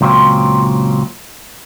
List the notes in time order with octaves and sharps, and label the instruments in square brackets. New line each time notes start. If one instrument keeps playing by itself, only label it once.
[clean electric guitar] C#2 A#2 F#3 C4 F4